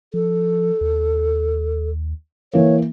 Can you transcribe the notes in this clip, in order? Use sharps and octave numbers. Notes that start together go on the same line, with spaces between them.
F3 A4
D#2
E3 A#3 C#5